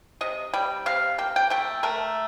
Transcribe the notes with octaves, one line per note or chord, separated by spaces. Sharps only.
C3 D#5
G3 G5
C3 F5
A#3 G5
G5
A3 G5
A3 A#4